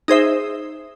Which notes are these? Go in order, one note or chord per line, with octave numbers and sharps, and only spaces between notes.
D#4 G#4 C5 E5